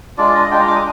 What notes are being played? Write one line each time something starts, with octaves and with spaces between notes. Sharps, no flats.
G#3 D4 F4 D5
D#5
G#3 D4 F4 G5
A#5
D6
D#6